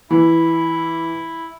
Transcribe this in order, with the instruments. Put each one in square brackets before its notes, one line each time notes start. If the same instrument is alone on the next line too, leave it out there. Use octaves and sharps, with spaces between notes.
[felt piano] E3 [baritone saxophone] E4